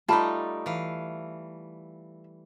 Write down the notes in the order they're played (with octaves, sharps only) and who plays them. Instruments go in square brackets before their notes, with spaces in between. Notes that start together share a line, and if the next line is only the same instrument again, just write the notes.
[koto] G3 A3 D#4 [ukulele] F4 A5 B5
[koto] E3 F5